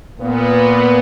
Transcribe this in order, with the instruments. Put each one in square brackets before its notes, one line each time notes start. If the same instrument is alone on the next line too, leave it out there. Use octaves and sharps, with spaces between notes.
[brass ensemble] A#2 B3